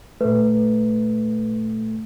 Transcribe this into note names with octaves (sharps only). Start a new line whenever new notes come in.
A#2 A3 B4